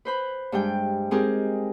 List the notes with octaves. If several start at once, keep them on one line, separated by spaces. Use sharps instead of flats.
B4 C5 B5
G2 G3 G#3 G5
G#3 C4 D#4 G4 G#4 A#4